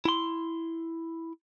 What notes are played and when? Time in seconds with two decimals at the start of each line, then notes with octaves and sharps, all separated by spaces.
0.05 E4 C6